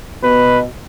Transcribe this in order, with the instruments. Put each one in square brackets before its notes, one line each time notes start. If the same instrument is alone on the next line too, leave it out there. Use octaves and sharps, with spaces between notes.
[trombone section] B2 [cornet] B4